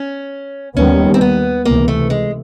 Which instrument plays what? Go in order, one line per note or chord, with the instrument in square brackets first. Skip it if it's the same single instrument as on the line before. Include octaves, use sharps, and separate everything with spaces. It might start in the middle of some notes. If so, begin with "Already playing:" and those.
Already playing: [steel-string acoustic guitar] C#4
[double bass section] D#2 D#3 G3 B3 [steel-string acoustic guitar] C#4
[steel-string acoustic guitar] C4
B3
[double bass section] C#2 C3 E3 [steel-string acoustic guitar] A#3
[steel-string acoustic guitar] A3
G#3